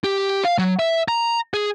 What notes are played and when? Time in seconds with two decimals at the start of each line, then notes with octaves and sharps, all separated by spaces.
0.04 G4
0.45 F5
0.58 F#3
0.79 E5
1.08 A#5
1.54 G#4